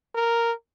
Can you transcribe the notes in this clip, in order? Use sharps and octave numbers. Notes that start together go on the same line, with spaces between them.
A#4